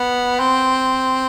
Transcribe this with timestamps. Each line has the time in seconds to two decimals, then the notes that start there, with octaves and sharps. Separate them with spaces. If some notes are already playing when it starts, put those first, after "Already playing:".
Already playing: B3
0.40 C4